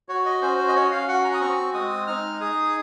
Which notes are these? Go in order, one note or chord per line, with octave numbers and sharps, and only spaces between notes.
F#4 C#5
D#5
C#4 C5
C5
D#5
C#4 C#5
F5
F#4 F#5
A#5
D#6
C4 C#6
G#3 D#6
D#4 F6
G#4 D#6